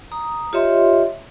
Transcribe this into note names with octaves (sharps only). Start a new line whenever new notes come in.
A#5 D#6
F4 G4 C#5 D#5 E5 C6